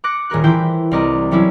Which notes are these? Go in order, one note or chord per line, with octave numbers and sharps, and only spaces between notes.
D6 F#6 A#6 C#7
D#1 G#4 A#4 F#6
E3 E4 C5 G5 G6
C2 C4 A#4 D5 D#5
E3 F#3 G3 C#4 D4 E4